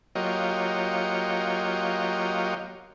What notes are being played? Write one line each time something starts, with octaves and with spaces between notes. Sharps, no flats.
F#3 A#3 F4 G4 C#5 D#5